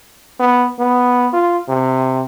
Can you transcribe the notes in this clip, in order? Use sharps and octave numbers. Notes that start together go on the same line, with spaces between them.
B3
B3
F4
C3